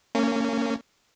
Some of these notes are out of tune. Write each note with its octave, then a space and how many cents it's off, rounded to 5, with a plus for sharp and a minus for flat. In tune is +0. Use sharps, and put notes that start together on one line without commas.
A#3 -30 C#4 +0